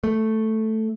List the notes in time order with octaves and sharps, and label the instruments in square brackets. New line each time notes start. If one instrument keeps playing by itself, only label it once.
[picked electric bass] A3